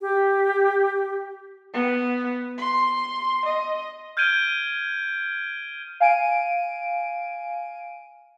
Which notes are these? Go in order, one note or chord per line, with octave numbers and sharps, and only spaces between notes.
G4
B3
C6
D#5
F6 G6 G#6 D7 D#7 G7
F5 G#5 D7 D#7